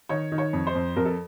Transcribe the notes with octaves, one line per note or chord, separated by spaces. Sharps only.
D#3 C#5
D#3
C#5
F2
C5
F2
F2 A#4
A4